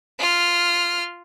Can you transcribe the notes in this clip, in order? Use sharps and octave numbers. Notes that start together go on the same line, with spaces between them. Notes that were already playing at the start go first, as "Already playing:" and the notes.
F4 F6